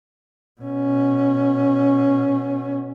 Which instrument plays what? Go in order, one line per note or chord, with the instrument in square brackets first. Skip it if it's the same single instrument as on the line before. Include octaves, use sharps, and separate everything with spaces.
[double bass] B2 C#4